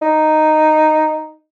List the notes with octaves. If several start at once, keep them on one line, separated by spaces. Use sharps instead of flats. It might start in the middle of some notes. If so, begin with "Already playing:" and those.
D#4